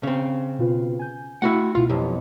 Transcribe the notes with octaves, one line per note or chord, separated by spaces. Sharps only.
C#3 C4
B2 F4 B4
G#5 G6
A3 E4 F#4 F#5
C#2 B2 E4 F4
B1 F2 G4